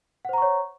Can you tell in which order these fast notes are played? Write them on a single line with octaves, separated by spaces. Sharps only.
F#5 C5 A#5 C#6 C#5